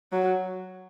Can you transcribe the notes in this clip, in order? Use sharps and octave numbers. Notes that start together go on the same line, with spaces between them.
F#3